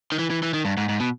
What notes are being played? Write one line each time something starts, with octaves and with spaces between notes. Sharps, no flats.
D#3
E3
E3
E3
D#3
G2
G#2
G#2
B2